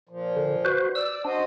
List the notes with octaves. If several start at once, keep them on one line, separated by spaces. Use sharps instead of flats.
A#2 F3
D3
F#4 B4 C5
D5 E6
D4 F#4 C5 D#5